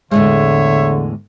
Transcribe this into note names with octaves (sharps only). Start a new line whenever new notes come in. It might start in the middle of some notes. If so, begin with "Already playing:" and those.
E2 A2 D3 G#3 C#5 E5